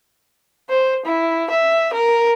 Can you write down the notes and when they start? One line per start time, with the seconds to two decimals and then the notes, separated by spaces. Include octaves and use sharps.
0.70 C5
1.06 E4
1.50 E5
1.93 A#4